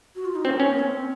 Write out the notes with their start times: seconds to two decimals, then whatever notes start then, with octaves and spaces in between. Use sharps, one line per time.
0.16 F#4
0.25 F4
0.35 D#4
0.45 C4 C#4
0.60 C4 C#4
0.70 A#3
0.79 C#4
0.84 C4